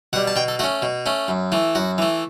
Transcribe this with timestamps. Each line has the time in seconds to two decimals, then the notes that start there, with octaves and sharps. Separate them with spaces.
0.13 B2 F#5
0.16 G3
0.27 A5
0.36 B2 G5
0.48 A4
0.59 A3 C#4 F#4
0.82 B2
1.06 A3 C#4
1.28 F#2
1.52 E3 A3
1.75 F#2 F#4
1.98 E3 A3